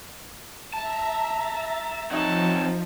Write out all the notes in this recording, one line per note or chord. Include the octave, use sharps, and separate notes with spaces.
E5 A5 A#5
F3 C4 D#4 C#5 F#5 A5